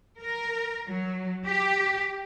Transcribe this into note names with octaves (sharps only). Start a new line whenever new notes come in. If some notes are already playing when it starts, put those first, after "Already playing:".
A#4
F#3
G4